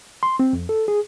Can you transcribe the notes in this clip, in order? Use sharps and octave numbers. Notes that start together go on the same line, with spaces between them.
C6
C4
F2
A4
G#4